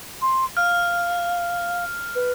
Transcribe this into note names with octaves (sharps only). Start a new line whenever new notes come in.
C6
F5 F6
B4